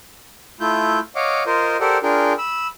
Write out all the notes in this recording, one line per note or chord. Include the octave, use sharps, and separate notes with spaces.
A3 E4 F4 G6
C#5 D#5 F5 F#5 D6
F4 A#4 C5 D#5
G4 A4 A#4 C5 D5 F#5
D4 F4 G#4 A#4 G5
B5 E6